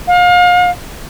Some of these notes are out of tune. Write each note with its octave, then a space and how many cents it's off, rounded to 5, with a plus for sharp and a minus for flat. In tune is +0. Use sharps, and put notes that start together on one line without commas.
F5 +35